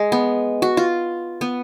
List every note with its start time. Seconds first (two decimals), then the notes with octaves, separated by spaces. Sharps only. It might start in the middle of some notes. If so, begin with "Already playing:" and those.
Already playing: G#3
0.12 B3
0.62 F#4
0.77 F4
1.41 B3